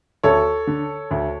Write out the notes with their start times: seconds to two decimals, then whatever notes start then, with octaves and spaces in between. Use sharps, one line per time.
0.24 D2 A4 C#5
0.67 D3
1.11 D2